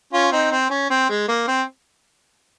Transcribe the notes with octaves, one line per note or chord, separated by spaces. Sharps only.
C#4 F4
C4 D#4
C4
C#4
C4
G#3
A#3
C4